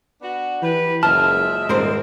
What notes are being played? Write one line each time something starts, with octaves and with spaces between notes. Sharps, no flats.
B3 D4 F#4
E3 G4 B4
F#1 F3 G#3 E5 A5 F6
D#1 G#2 E3 G#3 C4 A#4 C5